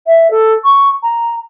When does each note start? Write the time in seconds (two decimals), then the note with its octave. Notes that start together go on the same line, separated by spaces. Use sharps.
0.07 E5
0.31 A4
0.64 C#6
1.03 A#5